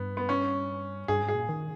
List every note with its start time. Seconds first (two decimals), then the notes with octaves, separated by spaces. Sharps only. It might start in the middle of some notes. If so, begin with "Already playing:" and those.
Already playing: G2 B3
0.17 B3
0.29 C#4
1.08 G2 G#4
1.22 G#2
1.28 G#4
1.35 A#2
1.49 D#3